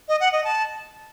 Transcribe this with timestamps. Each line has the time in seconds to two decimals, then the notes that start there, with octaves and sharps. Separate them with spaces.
0.08 D#5
0.20 F#5
0.32 D#5
0.44 A5